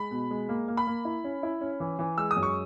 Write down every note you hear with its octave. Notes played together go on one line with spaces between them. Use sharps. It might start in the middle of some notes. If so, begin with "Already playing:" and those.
Already playing: G#3 B5
B2
G#3
A#3
A#3
B5
A#3
E4
C#4
E4
C#4
E3
E3
G#3 E6
D#6
F#2
C#6